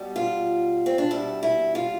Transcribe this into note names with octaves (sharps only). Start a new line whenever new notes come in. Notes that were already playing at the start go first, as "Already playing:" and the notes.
Already playing: B2 G3
F4
C4
D4
B2 G3 E4
E4
F4